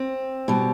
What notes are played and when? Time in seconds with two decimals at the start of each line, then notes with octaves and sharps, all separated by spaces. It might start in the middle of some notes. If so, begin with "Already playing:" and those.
Already playing: C4
0.48 B2 G3